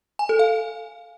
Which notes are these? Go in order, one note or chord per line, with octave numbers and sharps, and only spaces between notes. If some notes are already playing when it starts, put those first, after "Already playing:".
G#5
A4
F5